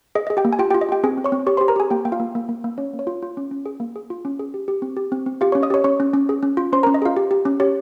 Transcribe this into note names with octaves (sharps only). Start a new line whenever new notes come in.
G#4 D#5
G#4 D#5
G4 G5
A#3
G#5
F4 G4 G5
F4 G4 G5
D#5
F4 G4 G5
C4 G#4 G#5
C4
C#5 C#6
C4
G4 C#5 C#6
G4 C5 C6
A#4 A#5
G4 G#4 G#5
A#3 G4 G5
A#3 G5
F4 F5
A#3
A#3
A#3
A#3
C#4 C#5
A#3
C#5
F4
F4
C#4
C#4
G#4
A#3
G#4
F4
C#4
G#4
G4
G4
C4
G4
C4
C4
F4 G4 F5
C#4 C#5 C#6
D#5 D#6
G4 C#5 C#6
C#4 C#5 C#6
C#4
C#4
G#4
C#4
F4
C#4 C5 C6
C#4 A#4 A#5
D#5
F4 G#4 F5
G4
G4
C#4
G4 C#5